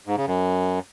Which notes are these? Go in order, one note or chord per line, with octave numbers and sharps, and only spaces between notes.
G#2
C#3
F#2